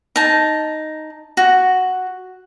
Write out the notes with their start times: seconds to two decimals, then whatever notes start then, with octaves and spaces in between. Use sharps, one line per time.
0.16 D#4 A5
1.37 F#4